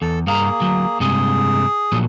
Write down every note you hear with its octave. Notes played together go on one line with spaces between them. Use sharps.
E2 A4
G2 A#3 G#4 F5 A#5
D2 F#3
G2 C3 G#3 G#4
A#2 F3 F#3